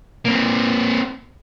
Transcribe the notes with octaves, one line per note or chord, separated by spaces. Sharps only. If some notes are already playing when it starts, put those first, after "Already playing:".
A#3 C4